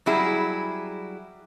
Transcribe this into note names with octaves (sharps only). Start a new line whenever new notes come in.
F#3 G3 E4 G#4